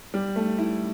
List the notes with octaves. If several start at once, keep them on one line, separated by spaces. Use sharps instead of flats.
G3
A3
E4